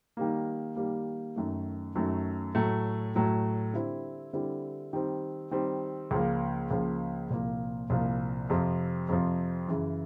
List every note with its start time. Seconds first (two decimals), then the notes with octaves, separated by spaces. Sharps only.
0.17 D#3 G3 A#3
0.76 D#3 G3 A#3
1.36 F#2 D#3 F#3 A3
1.95 F#2 D#3 F#3 A3
2.55 A2 F#3 A3
3.15 A2 F#3 A3
3.73 D3 G3 C4 E4
4.33 D3 G3 C4 E4
4.93 D#3 G3 C4
5.51 D#3 G3 C4
6.11 C#2 C#3 F3 A#3
6.71 C#2 C#3 F3 A#3
7.30 C2 A#2 F3 A#3
7.90 C2 A#2 F3 A#3
8.49 F2 C3 F3
9.08 F2 C3 F3
9.68 F#2 C#3 E3